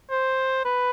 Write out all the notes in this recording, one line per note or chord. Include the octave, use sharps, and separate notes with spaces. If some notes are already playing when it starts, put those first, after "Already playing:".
C5
B4